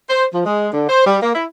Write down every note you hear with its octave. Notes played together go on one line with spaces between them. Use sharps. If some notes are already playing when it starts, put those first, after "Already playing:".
C5
F3
G#3
D3
C5
G3
A#3
E4